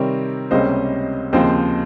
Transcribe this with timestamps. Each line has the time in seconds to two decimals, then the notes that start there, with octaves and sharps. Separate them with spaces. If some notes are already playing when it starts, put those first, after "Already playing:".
Already playing: C3 D#3 G3 C4 A#4 C#5
0.51 C#2 C3 G3 A#3 C#4 C5 D#5
1.33 D#2 C#3 F3 C4 C5 D#5